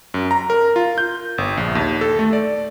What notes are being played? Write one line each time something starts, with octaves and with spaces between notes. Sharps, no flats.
F#2
A#5
A#4
F4
G6
G1
A#1
D#2
A4
A3
D5